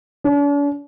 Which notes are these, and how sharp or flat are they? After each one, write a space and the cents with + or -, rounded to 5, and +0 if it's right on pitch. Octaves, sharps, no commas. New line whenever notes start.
D4 -45